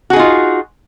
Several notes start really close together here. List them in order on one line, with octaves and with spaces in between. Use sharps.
F#4 G#4 D#4 F4